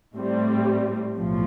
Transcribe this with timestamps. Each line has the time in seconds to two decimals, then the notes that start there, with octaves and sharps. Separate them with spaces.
0.16 A2 G3 C4
1.16 B1 A2 F3